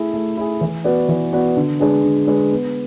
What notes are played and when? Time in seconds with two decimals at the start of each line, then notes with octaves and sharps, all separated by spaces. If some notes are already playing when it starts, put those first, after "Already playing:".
Already playing: A3 E4 G#4
0.14 A3
0.37 E4 G#4
0.61 E3
0.84 B3 F#4 B4 D5
1.09 E3
1.33 B3 F#4 B4 D5
1.57 D3
1.80 G#3 D4 G#4 B4
2.04 D3
2.27 G#3 D4 G#4 B4
2.51 B3